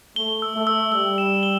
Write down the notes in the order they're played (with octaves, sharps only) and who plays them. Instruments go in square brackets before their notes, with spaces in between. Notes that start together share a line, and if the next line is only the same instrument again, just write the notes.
[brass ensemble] A3 [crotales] G7
[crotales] E6
[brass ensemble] A3
[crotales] E6
[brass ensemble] G3 [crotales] E6
[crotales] E7
G7